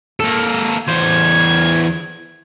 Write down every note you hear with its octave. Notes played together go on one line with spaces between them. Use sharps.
A#3 A4
E2 C5 G#6